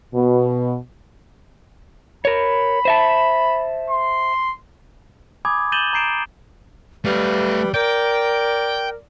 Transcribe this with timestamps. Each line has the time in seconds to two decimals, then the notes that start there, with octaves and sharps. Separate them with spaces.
0.14 B2
2.25 A#4 C#5 B5
2.85 C5 E5 A5
3.90 C6
5.45 G#5 B5 D6 D#6 G#6
5.72 G6 A6 D#7 E7 F#7 G7
5.93 A#5 G6 C7 D7 E7
7.05 G3 A3 B4 F5
7.74 A#4 D5 G5